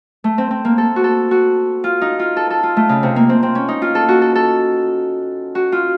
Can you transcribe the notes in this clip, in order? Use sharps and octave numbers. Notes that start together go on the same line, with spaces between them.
A3
C4
C4
A#3
A4
F#4
A4
F#4
F4
D#4
F4
A4
A4
F4
A3
C#3
C3
A#3
C4
C4
C#4
D#4
F4
A4
F#4
A4
A4
F#4
F4